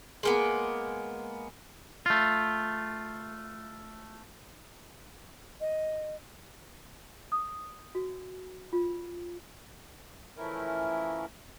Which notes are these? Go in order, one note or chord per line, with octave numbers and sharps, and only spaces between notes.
G#3 A#3 B3
A3 F4
D#5
D#6
F#4
F4
E3 F3 A3 C#4 E4 A#4